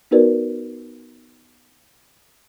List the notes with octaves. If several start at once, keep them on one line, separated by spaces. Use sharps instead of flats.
B3 D#4 F#4 A#4 B4 D5